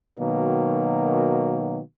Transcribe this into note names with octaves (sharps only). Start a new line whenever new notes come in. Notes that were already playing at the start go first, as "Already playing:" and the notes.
B2 D#3 F#3 A#3